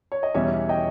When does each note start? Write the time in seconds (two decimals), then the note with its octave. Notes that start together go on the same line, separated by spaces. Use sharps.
0.12 C#5
0.23 D#5
0.34 E2 B2 G3 C#4 C#5 E5
0.69 D#5 G5